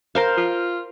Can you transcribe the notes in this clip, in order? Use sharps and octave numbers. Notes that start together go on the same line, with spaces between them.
A#4 C5 F5
F4